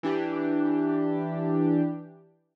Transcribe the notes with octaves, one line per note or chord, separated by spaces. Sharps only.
E3 D4 G4